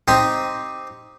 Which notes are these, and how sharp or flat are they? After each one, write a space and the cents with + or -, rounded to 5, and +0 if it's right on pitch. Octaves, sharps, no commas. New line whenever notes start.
C4 +0 D#4 +0 G4 +0